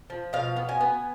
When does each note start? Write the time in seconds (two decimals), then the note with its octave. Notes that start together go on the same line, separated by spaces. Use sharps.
0.10 F3
0.33 B2 F5
0.56 B3
0.69 G#5
0.81 B3